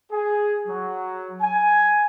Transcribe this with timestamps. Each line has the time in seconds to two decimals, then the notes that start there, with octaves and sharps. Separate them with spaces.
0.12 G#4
0.68 F#3
1.42 G#5